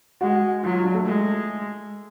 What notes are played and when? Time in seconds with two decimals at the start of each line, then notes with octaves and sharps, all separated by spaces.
0.21 G#3 F#4
0.63 F#3 F4
0.73 F4
0.84 D4
0.94 A3
1.06 G#3